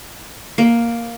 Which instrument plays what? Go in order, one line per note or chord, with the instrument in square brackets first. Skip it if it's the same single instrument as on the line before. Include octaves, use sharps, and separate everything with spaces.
[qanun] A#3